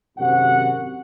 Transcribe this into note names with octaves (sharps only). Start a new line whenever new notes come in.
G#1 F#2 C3 F#4 F#5